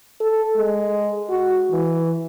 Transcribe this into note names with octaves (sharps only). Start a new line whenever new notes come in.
A4
G#3
F#4
E3